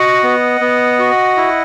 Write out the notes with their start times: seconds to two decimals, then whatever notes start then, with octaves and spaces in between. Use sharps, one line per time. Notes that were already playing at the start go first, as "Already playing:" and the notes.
Already playing: F#4 D#5 F#5
0.23 B3
0.61 B3
0.99 F#4
1.37 E4